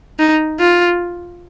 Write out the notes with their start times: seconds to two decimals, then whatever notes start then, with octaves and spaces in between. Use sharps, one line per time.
0.19 D#4
0.60 F4